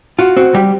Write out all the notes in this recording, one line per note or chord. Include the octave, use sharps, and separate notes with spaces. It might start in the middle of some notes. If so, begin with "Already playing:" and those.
F4 F#4
C4 F#4
G3 G4